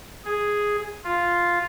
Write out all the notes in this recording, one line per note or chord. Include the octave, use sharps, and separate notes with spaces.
G#4
F4